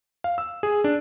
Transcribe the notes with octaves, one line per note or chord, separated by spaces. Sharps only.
F5
E6
G#4
D4